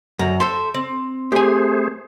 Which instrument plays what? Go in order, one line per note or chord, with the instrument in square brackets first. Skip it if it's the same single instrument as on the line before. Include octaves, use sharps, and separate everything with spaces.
[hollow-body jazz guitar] F#2 [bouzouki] D3 A#5
[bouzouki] A4 C5 E5 [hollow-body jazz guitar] C6
[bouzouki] C4
[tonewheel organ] A3 G#4 C5 [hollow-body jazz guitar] G4 G#5